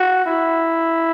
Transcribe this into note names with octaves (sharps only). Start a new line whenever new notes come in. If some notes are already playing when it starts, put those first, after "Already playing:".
Already playing: F#4
E4